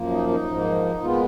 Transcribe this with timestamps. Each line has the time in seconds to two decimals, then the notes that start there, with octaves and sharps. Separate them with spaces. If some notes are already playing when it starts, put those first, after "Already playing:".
Already playing: F#2 F3 A#3
0.11 D#4
0.29 D#4
0.47 G#2 F3 A#3
1.02 A#2 G#3 B3 F4